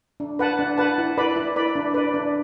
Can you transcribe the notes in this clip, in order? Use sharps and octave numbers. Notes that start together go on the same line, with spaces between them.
D4
B4 F#5 A5
D4
B4 F#5 A5
E4
B4 D5 B5
E4
B4 D5 B5
D4
B4 D5
D4